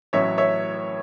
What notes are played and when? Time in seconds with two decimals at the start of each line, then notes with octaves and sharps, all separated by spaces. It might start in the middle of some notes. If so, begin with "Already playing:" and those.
0.13 A1 A2 F#3 C#5 E5
0.38 C#5 E5